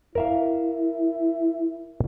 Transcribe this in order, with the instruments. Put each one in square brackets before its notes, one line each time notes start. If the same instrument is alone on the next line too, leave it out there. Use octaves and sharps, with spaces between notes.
[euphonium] E4 [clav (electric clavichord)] A#4 E5 F5